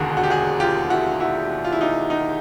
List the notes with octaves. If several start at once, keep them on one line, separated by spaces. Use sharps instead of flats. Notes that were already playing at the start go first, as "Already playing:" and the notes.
Already playing: E1 D#2 D3 F#4 G#4
F#4
G4
F#4 G#4
F4 G4
E4 F#4
E4 F#4
F4
E4
D#4 F4
D#4